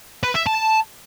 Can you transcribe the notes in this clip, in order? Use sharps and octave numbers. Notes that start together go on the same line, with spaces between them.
B4
E5
A5